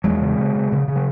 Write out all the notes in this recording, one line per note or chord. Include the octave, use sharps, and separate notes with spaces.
E2 F#3 G#3
C#3
C#3
C#3
C#3
C#3
F#3